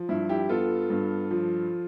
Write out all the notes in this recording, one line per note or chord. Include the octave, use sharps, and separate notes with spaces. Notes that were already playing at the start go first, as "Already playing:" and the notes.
Already playing: F3
G2 E4
E4 G4
B3 F4 A4
G2
F3